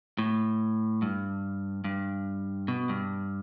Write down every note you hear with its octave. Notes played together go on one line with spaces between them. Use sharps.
A2
G2
G2
B2
G2